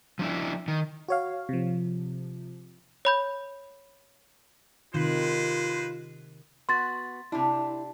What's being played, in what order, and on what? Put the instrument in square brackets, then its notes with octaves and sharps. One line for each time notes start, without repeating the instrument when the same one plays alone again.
[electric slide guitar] F3 D4 E4
D#3
[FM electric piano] F#4 C#5 F5
C3 F3
[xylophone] C#5 B5 G6
[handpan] C3 D#3 [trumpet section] G#3 B4 C5 [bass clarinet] F4
[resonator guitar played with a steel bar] B3 F#4 [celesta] C6 A6
[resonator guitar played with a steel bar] C3 D4 [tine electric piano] E4